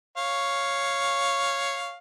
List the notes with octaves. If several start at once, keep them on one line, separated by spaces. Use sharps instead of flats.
C#5 F5